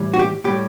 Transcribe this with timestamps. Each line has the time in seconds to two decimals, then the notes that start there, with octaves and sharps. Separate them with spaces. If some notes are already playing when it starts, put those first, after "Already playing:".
Already playing: A2 E3 G3
0.14 F#4
0.19 G4
0.44 A2 G3 G4